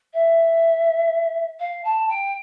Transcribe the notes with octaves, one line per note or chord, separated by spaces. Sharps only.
E5
F5
A5
G5